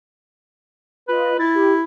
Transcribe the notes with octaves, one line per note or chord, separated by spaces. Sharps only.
F4 B4 D#5
E4 A6
G4